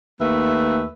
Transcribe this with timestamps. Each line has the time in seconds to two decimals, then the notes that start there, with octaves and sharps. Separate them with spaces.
0.21 D#2 A3 B4 E5